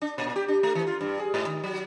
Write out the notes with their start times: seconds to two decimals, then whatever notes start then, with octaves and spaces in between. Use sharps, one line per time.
0.02 D4
0.18 A#2
0.36 G4
0.48 D4
0.63 A3
0.75 E3
0.87 F4
1.01 G2
1.19 G#4
1.34 G#2
1.46 D#3
1.64 F#3